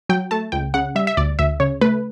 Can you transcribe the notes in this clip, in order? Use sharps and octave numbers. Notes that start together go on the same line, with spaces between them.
F#3 G5
A3 A5
C#2 G5
C#3 F#5
G3 E5
E5
D2 D5
D2 E5
C#3 C#5
A3 B4